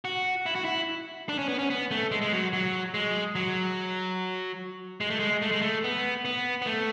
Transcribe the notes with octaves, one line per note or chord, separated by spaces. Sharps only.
F#4
E4
F#4
E4
D4
C#4
B3
C#4
B3
A3
G#3
G#3
F#3
F#3
G#3
F#3
G#3
A3
G#3
A3
G#3
A3
B3
B3
B3
A3